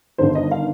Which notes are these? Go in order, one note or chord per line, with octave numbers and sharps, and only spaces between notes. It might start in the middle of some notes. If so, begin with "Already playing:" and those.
G1 G2 D#3 C5
D#5
F5